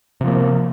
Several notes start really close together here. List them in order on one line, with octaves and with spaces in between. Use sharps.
C3 F3 A#3